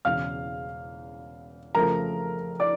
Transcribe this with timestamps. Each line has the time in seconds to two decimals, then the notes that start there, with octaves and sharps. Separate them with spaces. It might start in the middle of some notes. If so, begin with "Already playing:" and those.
0.05 E1 E2 C#3 F5 F6
1.75 F2 C#3 F3 A3 A#4 A#5
2.60 D5 D6